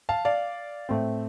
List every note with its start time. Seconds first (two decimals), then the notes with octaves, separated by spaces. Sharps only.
0.09 F5 A5
0.25 D5 F5
0.89 A2 A3 C4